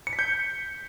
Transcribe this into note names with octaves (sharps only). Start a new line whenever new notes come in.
C#7
B6
G6